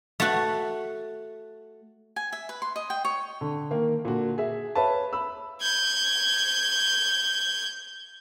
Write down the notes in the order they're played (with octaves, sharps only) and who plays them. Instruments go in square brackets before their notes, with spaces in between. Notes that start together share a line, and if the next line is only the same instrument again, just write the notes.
[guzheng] A3 F#4
[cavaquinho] G#5
E5
B4
C6
D#5
G5
C#5
[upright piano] D3
D#3 A#3 A#4
A#2 D3 F#4
G#4 E5
B4 C#5 E5 F5 A5
B5 E6
[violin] G6 G#6